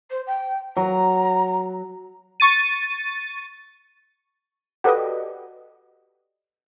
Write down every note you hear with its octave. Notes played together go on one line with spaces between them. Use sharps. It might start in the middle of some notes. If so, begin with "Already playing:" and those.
C5
G5
F#3 A#5
C#6 A6 D#7
F#4 G4 A4 B4 D5 D#5